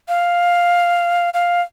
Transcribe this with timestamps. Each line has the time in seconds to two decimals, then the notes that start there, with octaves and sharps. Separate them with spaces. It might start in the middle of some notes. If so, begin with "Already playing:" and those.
0.08 F5
1.34 F5